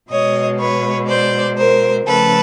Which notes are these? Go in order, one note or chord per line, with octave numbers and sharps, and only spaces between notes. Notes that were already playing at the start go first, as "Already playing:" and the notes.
B2 G#3 C#5 D#5
B4 C#5
C5 D5
A#4 C5
C#3 F3 A3 A4 B4